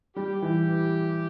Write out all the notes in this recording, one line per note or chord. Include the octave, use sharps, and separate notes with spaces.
G3 G4
E3